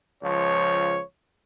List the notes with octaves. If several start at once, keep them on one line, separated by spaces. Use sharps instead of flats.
C#2 F3 C#5